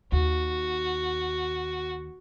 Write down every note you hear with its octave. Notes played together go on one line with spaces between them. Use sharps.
D#2 F#4